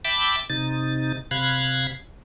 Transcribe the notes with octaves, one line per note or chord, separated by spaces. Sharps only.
E5 G5 A5 B5 D6
C3 D#4 A6
C3 F5 B5 F#6 G#6